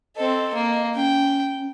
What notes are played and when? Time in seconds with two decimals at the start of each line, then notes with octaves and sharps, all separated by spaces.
0.17 C4 A4 D#5
0.54 A#3
0.95 C#4 G5